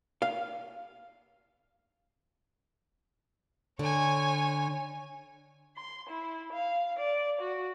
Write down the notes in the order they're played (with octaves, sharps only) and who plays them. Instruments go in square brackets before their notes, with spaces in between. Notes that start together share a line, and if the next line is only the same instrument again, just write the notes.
[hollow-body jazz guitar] F5
[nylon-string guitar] D3 [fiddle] C#5 G#5
[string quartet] C6
E4
F5
D5
F#4